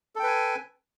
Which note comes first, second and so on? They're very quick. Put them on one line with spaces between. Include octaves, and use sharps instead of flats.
A4 G5 B4 G#5